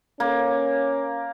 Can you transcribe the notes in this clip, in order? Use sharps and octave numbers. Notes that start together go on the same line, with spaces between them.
A#3 C#4